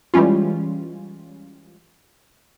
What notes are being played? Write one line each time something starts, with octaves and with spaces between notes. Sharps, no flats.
E3 G3 G#3 C#4 F4